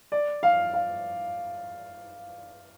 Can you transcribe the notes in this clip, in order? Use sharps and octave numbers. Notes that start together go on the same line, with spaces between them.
D5
F5
F5